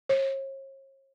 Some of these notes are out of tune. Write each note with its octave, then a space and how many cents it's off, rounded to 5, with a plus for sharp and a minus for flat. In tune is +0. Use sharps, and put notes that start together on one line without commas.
C#5 -40